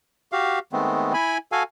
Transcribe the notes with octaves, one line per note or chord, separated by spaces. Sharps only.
F#4 G4 F5
D#3 G#3 A3 B3 C4
E4 G#5 B5
F#4 A4 F5 G#5